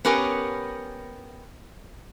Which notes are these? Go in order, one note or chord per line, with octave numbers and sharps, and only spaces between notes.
B3 C#4 G4 A#4 C#5 G#5